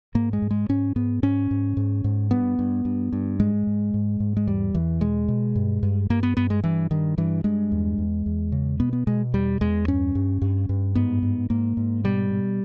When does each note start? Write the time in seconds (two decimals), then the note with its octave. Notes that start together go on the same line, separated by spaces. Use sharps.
0.15 G#2 A#3
0.33 G#3
0.42 G#2
0.51 G#3
0.69 G#2 C#4
0.96 G#2 B3
1.23 G#2 C#4
1.51 G#2
1.77 G#2
2.04 G#2
2.31 G2 B3
2.59 G2
2.85 G2
3.13 G2
3.39 G#2 G#3
3.67 G#2
3.94 G#2
4.20 G#2
4.37 G#3
4.47 E2 G3
4.75 E2 E3
5.01 B2 G#3
5.28 B2
5.55 G2
5.83 G2
6.10 G2 A#3
6.23 B3
6.37 G2 B3
6.50 G#3
6.64 G2 E3
6.91 G2 D#3
7.18 G2 E3
7.44 G2 G#3
7.72 E2
7.98 E2
8.26 E2
8.52 C#3
8.80 B2 B3
8.93 B3
9.07 B2 G#3
9.33 E2 G3
9.61 E2 G#3
9.88 G2 C#4
10.15 G2
10.42 G2
10.69 G2
10.95 G#2 B3
11.23 G#2
11.50 G#2 A#3
11.77 G#2
12.04 B2 G3
12.31 B2